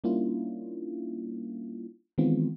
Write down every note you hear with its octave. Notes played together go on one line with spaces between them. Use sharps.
G3 A#3 C#4 D4 E4 F4
D#3 E3 G#3 B3 C4 F4